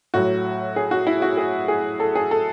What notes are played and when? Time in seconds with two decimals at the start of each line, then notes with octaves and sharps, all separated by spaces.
0.14 A2 F#3 F#4
0.76 G#4
0.91 F#4
1.07 E4
1.22 F#4
1.37 G#4
1.68 G#4
2.00 A4
2.15 G#4
2.31 A4